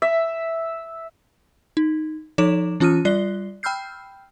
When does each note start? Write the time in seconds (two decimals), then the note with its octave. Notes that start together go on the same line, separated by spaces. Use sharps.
0.02 E5
1.77 D#4
2.38 F3 D#4 A4 C#5 D6 E7
2.80 E3 C#4 F4 D#6 F6 D#7
3.05 G3 F4 D5 F#6 C7 G7
3.63 G5 B5 E6 F6 G6 C7